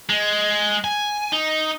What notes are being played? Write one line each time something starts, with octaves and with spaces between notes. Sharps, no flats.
G#3
G#5
D#4